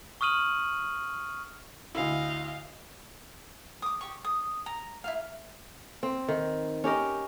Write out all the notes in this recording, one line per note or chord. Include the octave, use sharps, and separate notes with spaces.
C#6 D#6 F6 D#7 F#7
D2 E4 D#5 F5
D6 D#6
G4 C#6
D#6
A#5
E4 F#4 F5
C4
D#3
C#4 G4 A#4 D#5